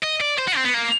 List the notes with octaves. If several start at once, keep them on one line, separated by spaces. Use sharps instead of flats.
D#5
D5
C5
F#4
C4
B3
A#3